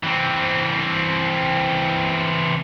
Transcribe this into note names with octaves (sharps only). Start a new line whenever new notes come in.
E3 C4